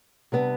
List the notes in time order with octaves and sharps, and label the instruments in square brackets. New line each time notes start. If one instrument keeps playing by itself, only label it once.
[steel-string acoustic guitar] C3 G3 B3 D4